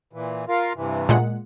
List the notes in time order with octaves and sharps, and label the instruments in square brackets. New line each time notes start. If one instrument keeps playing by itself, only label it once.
[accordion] A#2 E3
F4 A#4 F5
G2 C3 E3
[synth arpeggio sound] A#2 G#3 F#5